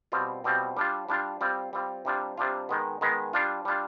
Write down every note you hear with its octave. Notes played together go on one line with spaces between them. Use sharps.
B2 G3 C4 F4
B2 G3 C4 F4
G3 D4 F4
G3 D4 F4
G3 C4 F4
G3 C4 F4
C3 G3 D4 F4
C3 G3 D4 F4
D#3 G#3 B3
D#3 G#3 B3
G3 D4 F4
G3 D4 F4